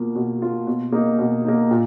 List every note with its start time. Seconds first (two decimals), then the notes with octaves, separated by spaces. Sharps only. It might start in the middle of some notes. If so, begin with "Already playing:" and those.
Already playing: B2 A#3 F4
0.15 B2
0.42 A#3 F4
0.67 B2
0.92 A#3 D#4
1.19 B2
1.45 A#3 D#4
1.71 A#2